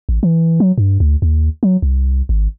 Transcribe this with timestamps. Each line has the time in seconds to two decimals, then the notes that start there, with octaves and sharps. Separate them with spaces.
0.09 A1
0.23 E3
0.60 F#3
0.78 G2
1.00 D2
1.22 D#2
1.63 F#3
1.82 C2
2.29 G#1